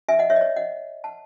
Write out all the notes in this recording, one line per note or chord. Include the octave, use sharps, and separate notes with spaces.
E5 G#5
D#5 F#5
C#5 E5
D#5
C#5 E5
D#5 F#5
F#5 A5